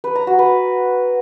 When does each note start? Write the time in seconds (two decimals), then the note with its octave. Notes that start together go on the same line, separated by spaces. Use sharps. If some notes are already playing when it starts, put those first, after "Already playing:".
0.04 B4
0.15 A#5
0.27 F#4
0.39 B4